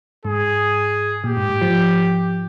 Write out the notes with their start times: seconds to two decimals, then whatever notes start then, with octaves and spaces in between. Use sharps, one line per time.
0.25 G#2 G#4
1.24 A#2 G4
1.37 G#2
1.49 G#2
1.62 F3